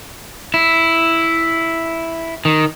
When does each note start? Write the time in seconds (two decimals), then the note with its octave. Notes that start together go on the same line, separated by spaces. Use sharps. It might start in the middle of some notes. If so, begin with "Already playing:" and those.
0.54 E4
2.45 D#3